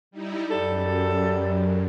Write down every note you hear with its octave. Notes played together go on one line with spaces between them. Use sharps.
G3 D#4 E4
F#2 G3 A4